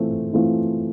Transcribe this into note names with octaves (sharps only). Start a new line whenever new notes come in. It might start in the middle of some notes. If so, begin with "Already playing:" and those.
Already playing: E3 A3 C4 F4
E3 A3 C4 F4